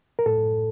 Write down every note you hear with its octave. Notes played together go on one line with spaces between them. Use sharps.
A#4
A2 A4